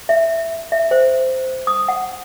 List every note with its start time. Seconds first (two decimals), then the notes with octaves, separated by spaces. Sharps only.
0.09 E5
0.72 E5
0.91 C5
1.67 D#6
1.88 F#5